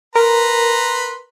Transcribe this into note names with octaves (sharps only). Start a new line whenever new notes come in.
A#4 B4 A#5 C6